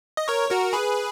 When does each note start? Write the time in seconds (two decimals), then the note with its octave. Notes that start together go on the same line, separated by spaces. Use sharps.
0.17 D#5
0.28 A#4 C#5
0.50 F#4 A#4
0.73 G#4 B4